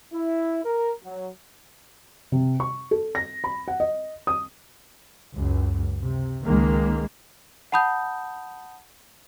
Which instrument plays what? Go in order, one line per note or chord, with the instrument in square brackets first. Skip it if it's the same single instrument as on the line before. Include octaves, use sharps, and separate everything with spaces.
[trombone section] E4
A#4
F#3
[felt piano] C3
C#6
A4
A#6
B5
F#5
D#5
D#6
[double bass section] C#2 F#2
C3
C#2 D#3 G#3 A#3
[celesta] F#5 A5 B5 D#6 G6